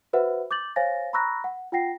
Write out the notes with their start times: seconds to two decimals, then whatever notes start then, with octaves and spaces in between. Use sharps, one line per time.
0.13 F#4 B4 C5 E5 F#5
0.51 D6 G6 A6 F#7
0.76 C5 C#5 F5 G#5 A6 A#6
1.13 A#5 B5 C#6 E6 F#6 A#6
1.44 F#5
1.72 F4 F#5 G5 A#6 C7